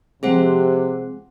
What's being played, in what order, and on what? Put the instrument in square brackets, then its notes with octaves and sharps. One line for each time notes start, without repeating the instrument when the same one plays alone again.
[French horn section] C3 [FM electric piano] F3 G#3 C4 [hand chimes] G#4 C5 F#5